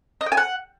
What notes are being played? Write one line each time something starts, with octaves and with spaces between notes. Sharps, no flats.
D#5
G5
G#5
F#5